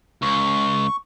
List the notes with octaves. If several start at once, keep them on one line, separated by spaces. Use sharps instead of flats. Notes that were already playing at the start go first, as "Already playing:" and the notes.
C#2 C#6